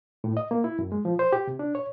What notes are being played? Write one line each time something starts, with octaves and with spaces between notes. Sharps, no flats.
A2
D#5
A#3
E4
F#2
G#3
F3
C5
G4
C3
D4
C#5